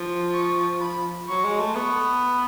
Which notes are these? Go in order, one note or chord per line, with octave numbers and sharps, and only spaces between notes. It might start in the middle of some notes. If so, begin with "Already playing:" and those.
Already playing: F3
C#6
B5
F#3 C#6
G#3
A3
B3 C#6